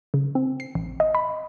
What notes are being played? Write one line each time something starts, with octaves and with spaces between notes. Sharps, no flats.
C#3
C4
C7
A1
D#5
B5